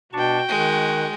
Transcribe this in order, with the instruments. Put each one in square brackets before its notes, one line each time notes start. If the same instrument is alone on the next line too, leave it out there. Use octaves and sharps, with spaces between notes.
[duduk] B2 [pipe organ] D4 A5 C#6 [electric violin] F#4 G5
[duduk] D#3 [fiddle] G#3 [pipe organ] C#6 F#6